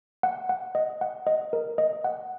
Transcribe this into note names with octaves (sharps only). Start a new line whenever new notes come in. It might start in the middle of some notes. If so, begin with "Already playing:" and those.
F#5
F#5
D#5
F#5
D#5
A#4
D#5
F#5